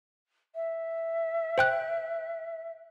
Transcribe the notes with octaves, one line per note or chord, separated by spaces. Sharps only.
E5
C5 G5 F#6